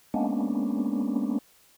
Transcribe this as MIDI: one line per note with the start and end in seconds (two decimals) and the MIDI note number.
0.14 1.38 56
0.14 1.38 58
0.14 1.38 59
0.14 1.38 61
0.14 1.38 62